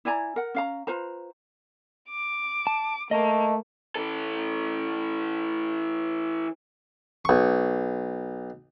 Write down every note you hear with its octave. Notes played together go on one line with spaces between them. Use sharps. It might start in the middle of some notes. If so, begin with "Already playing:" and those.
E4 D5 G#5 A#5
A#4 F#5
C#4 F5 A#5
F4 B4 C5 A#5
D6
A5
A3 A#3 D#5
E3 A4
B1 C#6